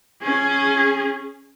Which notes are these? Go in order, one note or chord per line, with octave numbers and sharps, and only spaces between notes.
C#4 G#4